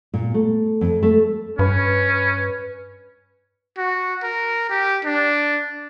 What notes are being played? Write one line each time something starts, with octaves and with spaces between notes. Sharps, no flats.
A#2
A3
F2
A3
G2 C#4 B4
F#4
A#4
G4
D4